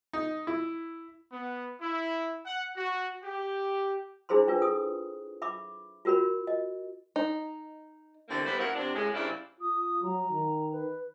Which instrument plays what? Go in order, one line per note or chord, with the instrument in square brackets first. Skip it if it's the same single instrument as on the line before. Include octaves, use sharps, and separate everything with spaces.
[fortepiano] D#4
E4
[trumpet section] B3
E4
F#5
F#4
G4
[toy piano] D4 E4 G#4 C5 B5 C6
C#4 D4 F4 B4
A4 D#6
E5 B5 D6
F4 F#4 A#4 C#5 B5
D#5
[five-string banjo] D#4
[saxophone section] B2 D3 E3 G3 A#3 C4
G3 B3 E4 B4 C5
F#2 A#3 E4 F4 A#4 F#5
F2 C3 C4 D4
F#2 A2 G#3
C#3 G3 A#3 C4 D4 E4
[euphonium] F4 [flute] D#6
[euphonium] F#3 [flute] A#5
[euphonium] D#3
[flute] B4